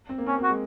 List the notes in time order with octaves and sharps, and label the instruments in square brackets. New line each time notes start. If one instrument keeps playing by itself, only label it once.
[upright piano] C4
A#3
[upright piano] C4 [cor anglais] C#4
[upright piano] A#3
[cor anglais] F#4
[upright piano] G#3